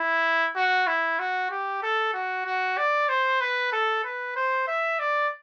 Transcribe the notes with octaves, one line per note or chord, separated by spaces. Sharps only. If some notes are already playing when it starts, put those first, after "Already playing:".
Already playing: E4
F#4
E4
F#4
G4
A4
F#4
F#4
D5
C5
B4
A4
B4
C5
E5
D5